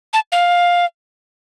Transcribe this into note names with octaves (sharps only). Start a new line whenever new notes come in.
A5
F5